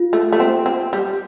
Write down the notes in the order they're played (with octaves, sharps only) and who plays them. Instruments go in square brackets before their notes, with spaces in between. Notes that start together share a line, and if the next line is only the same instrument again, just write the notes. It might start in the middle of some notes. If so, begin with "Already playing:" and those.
Already playing: [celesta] F4
[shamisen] A3
A3
C4
C4
G3